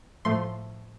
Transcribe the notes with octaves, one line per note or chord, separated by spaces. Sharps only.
A2 F3 A3 C6